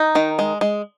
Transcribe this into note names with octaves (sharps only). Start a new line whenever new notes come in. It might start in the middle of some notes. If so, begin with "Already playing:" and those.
Already playing: D#4
D#3
G#3
G#3